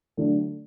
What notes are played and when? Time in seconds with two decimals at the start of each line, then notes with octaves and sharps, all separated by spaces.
0.17 D3 F#3 A3 D4